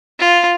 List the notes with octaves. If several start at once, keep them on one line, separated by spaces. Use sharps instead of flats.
F4